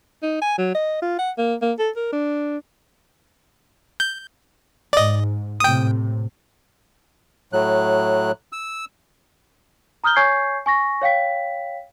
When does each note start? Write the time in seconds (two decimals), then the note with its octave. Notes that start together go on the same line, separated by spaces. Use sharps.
0.23 D#4
0.42 G#5
0.58 F#3
0.75 D#5
1.02 F4
1.18 F#5
1.38 A#3
1.62 A#3
1.79 A4
1.96 A#4
2.12 D4
4.00 G6
4.93 G#2 D5 D#5
5.60 A2 C3 G5 D#6
7.53 A2 F#3 F#6
8.52 E6
10.04 A#5 D#6 F6 G6 G7
10.16 C#5 G#5 C#6 G6 G#6 C7
10.66 G#5 C#6 A#6
11.02 C#5 F5 G5 B6